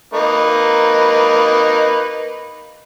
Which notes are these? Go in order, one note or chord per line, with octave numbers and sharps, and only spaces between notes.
A#3 D#4 B4